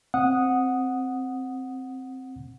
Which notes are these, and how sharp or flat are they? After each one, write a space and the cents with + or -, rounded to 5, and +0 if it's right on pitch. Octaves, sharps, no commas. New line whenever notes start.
C4 +0 F#5 -10 D#6 +0